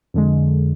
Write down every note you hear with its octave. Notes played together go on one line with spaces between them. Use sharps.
F2 D3 G#3